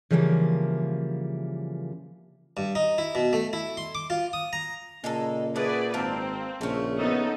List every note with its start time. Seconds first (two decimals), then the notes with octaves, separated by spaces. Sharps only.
0.11 C#3 E3 F3 G3 G#3 A#3
2.57 G2
2.75 D#4
2.98 E4
3.15 B2
3.33 A3
3.53 E4
3.77 C6
3.95 D6
4.10 F4
4.33 D#6
4.53 A#5
5.04 A#2 C#3 G#3 D#4 A4
5.56 A3 G#4 B4 D5 F#5
5.94 G#1 C4 F4 A#4 A5
6.61 A#1 C#3 A3 C#4
6.98 B3 D#4 A4